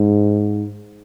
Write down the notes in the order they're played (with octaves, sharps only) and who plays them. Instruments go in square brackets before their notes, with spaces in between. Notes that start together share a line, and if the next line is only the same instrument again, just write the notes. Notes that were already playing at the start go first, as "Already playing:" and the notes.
Already playing: [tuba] G#2